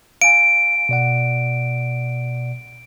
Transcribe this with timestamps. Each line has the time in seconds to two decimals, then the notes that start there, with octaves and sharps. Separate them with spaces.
0.22 F5 G#5 D7
0.89 B2 D5 F#5